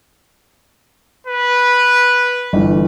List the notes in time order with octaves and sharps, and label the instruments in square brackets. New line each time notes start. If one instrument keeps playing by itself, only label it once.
[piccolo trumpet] B4
[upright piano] G1 E3